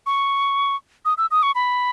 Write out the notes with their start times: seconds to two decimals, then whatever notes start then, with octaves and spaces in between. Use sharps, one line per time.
0.06 C#6
1.05 D#6
1.18 E6
1.31 D#6
1.43 C#6
1.55 B5